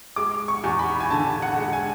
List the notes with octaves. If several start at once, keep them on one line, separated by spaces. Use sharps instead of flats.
G#3 D6
C#6
E2
B5
G#5
D3 A5
F#5
G#3
G#5